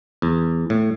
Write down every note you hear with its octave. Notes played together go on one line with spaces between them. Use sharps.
E2
A2